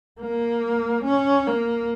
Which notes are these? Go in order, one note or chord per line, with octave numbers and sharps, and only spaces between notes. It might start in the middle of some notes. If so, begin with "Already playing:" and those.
A#3
C#4
A#3